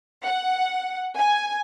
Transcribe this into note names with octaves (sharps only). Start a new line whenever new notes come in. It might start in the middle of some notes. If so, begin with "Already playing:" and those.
F#5
G#5